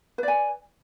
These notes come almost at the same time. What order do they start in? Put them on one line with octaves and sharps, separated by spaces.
B4 D5 G#5